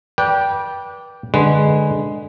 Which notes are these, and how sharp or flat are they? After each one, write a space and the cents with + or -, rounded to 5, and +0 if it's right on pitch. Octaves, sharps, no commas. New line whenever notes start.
B4 -30 D5 -10 G5 +0
D3 +15 G#3 +0 B4 +0